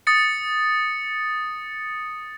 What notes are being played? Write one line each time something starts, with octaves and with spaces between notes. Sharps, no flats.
D#6 A6 C#7